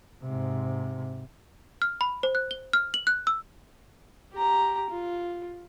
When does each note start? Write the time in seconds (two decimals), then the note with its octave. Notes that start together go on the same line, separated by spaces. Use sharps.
0.24 G#2 C3
1.82 F6
2.01 B5
2.23 C5
2.35 F#6
2.51 G7
2.73 F6
2.94 F#7
3.07 F#6
3.27 E6
4.33 G4 A#5
4.90 F4